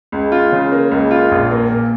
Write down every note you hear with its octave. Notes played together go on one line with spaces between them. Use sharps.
C#2
F4
C#3
A#3
C#2
F4
A#1
A#3
A#2